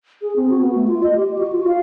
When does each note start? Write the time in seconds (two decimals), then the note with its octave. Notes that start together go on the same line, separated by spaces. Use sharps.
0.22 G#4
0.36 C4
0.50 F#4
0.62 B3
0.75 A3
0.88 F4
1.03 D#5
1.16 G4
1.38 F#4
1.52 F4
1.68 F5